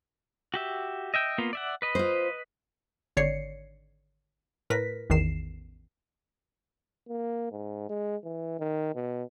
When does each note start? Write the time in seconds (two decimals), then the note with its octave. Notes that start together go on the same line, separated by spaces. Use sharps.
0.54 F#4 G4 E5
1.14 D#5 E5 G5
1.38 A#3 B3 F4
1.53 D5 E5 F#5
1.82 B4 D#5 B5
1.95 F4 C5
3.17 G#1 D3 C#5 D5 C7 C#7
4.70 A2 A#4 B4 A#6 B6
5.10 A1 E2 D#3 C7 E7
7.09 A#3
7.52 G#2
7.89 G#3
8.24 E3
8.59 D#3
8.95 B2